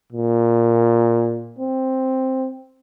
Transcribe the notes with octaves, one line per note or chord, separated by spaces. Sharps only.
A#2
C4